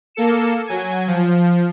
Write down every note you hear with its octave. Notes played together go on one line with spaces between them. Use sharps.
A#3 A4 C#7 E7
F#3 G#5
F3